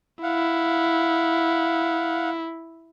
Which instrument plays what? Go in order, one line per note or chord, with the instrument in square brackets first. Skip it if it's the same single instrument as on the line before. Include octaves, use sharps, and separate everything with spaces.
[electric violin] E4 [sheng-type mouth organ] F5 F#5